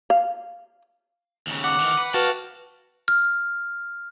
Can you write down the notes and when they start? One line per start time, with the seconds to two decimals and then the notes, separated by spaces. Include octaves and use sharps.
0.10 F5
1.47 D#2 C#3
1.64 F#5 D6
1.80 D#3 E3
1.98 B4
2.14 F#4 B4 F5 G5 A5
3.08 F6